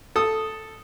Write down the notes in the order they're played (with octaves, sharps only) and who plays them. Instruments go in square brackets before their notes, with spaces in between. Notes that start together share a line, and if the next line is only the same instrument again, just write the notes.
[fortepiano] A4 D#6